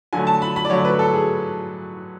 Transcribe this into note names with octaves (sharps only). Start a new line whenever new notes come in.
D3 F#3 A3 G#5
A5
B5
B5
D5
D3 F#3 A3 C#5
B4
A4
G#4